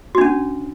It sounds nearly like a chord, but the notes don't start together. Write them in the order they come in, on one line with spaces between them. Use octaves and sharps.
F#4 D4 C#4